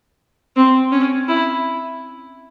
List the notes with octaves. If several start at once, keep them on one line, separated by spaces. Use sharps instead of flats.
C4
C#4
E4